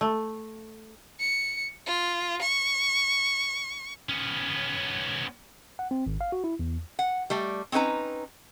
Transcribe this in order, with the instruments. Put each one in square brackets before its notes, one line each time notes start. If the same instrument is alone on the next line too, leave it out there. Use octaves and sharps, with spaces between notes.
[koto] A3
[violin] C#7
F4
C#6
[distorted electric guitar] B3 C#4
[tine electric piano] F#5
C4
G#1
F5
F#4
E4
E2
[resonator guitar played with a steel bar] F#5
G3 A3 D5
C4 C#4 D#4 B4 A#5